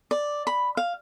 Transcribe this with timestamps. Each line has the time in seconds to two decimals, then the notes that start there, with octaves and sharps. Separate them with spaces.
0.11 D5
0.47 B5
0.77 F5